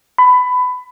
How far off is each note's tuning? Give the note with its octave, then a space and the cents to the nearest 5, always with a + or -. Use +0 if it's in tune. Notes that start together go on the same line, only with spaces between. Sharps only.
B5 +20